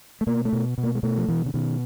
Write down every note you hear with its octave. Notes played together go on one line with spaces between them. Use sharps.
A3
B2 A#3
A3
B2
B2
A#3
G#3
B2 A3
F3
B2 E3
D3
B2 D#3